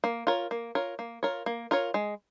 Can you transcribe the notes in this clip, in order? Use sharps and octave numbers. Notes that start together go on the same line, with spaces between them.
A#3
F4 A#4 C#5
A#3
F4 A#4 C#5
A#3
F4 A#4 C#5
A#3
F4 A#4 C#5
G#3